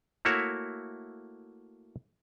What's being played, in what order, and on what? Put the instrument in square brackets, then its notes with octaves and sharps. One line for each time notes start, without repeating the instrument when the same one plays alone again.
[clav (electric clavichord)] A3 A#3 E4 F#4 C#5 E5